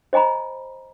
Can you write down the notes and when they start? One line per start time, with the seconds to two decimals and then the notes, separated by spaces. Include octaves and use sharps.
0.13 C5 D#5 G#5 A#5 B5